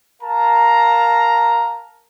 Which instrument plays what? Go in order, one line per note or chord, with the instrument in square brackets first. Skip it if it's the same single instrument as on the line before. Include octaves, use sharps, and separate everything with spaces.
[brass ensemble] A#4 F5 A5 A#5